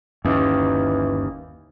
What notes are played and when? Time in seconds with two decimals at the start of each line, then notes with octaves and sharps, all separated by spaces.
0.25 G1 D#2 E3 C#4